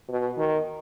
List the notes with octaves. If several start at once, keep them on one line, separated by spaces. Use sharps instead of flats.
B2
D#3